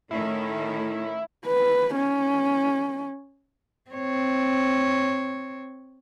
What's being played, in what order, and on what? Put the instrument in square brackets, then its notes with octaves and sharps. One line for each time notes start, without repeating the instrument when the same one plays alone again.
[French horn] A2 [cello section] D#3 A3 C#4 [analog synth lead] E4
[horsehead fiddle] B4
C#4
[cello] C4 C#5